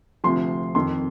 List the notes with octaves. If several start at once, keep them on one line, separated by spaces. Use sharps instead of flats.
D2 C3 F3 C6
F2 D#3 C6